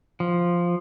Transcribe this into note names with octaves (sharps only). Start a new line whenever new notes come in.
F3